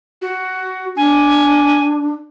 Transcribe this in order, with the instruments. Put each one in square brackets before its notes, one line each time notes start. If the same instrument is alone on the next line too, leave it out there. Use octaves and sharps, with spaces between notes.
[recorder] F#4
[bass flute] D4 [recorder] G#5